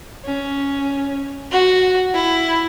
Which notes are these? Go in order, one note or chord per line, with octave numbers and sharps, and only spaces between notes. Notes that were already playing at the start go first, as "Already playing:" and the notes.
C#4
F#4
E4